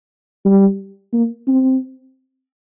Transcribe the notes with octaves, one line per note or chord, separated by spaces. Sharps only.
G3
A#3
C4